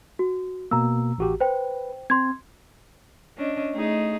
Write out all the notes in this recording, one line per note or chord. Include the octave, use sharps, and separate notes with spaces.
F#4
B2 A#3 A#5 E6
A1 F#4 G4
B4 C5 G5
C4 C6 G#6
C#4 D4 D#5
A3 D#4 G#4